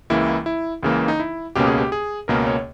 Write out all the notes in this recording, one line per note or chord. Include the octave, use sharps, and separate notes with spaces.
C#2 C#3 E3 A#3 E4
E4
C#2 C#3 E3 A#3
D#4
E4
C#2 B2 A#3 C#4 G4
G#4
G4
G#4
C#2 B2 A#3 C#4 A#4
C#5